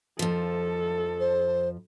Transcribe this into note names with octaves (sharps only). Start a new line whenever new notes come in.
F2 F3 A4
C5